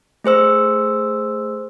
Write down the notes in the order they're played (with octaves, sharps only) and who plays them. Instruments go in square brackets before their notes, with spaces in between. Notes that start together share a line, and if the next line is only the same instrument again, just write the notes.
[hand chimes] A3 G#4 C5 E6